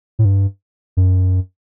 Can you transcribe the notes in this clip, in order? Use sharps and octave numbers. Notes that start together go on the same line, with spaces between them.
A2
G2
F#2